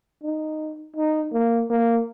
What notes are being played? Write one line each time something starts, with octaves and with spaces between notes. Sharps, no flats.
D#4
D#4
A#3
A#3